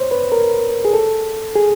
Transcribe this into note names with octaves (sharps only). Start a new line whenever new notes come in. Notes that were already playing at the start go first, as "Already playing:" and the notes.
Already playing: C5 C#5
B4
A#4
G#4
A4
G#4